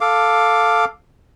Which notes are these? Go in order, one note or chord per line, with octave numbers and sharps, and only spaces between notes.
A4 F5 D6